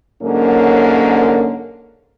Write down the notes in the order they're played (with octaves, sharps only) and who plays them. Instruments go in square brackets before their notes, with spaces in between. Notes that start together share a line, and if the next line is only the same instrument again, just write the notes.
[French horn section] G#2 D3 F#3 A#3 C#4 A#4